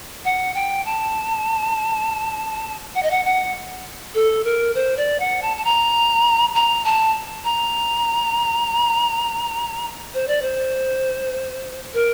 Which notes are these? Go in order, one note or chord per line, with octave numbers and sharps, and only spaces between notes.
F#5
G5
A5
F#5
D#5
F#5
F#5
A4
A#4
C5
D5
F#5
A5
A5
A#5
A#5
A5
A#5
C5
D5
C5
A#4